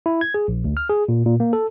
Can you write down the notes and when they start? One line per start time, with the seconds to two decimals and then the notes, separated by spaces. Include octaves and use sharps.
0.06 E4
0.21 G#6
0.34 G#4
0.48 A#1
0.64 D2
0.77 F6
0.89 G#4
1.09 A#2
1.26 A#2
1.40 A#3
1.53 A4